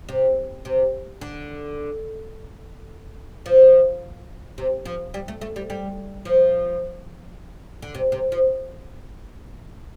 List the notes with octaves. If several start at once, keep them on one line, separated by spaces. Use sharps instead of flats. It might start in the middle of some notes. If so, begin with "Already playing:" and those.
C3
C3
D3
F3
C3
F3
G3
A3
A3
G3
G3
F3
D3
C3
C3
F3